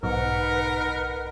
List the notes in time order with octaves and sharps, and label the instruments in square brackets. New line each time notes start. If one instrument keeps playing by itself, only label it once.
[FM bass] B1 [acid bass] G#2 [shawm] A#4 [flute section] B4 D#5 F#5